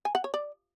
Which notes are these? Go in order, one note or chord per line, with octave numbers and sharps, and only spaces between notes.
G#5
F#5
C#5
D5